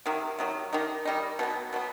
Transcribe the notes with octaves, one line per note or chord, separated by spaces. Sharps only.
C3 D#3 F#3
C3 D#3 F#3
D#3 G3 D#4
D#3 G3 D#4
B2 F#3 B3
B2 F#3 B3